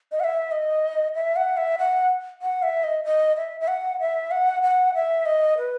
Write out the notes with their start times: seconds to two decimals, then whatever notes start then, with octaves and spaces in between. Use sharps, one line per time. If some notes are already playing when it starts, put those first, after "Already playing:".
0.12 D#5
0.20 F#5
0.24 E5
0.51 D#5
1.15 E5
1.36 F#5
1.57 E5
1.79 F#5
2.42 F#5
2.63 E5
2.84 D#5
3.05 D#5
3.37 E5
3.60 E5
3.68 F#5
4.00 E5
4.31 F#5
4.63 F#5
4.95 E5
5.26 D#5
5.58 B4